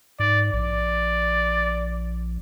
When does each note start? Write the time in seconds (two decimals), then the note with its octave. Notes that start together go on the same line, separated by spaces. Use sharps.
0.20 G#2 D5
0.53 A#1 D5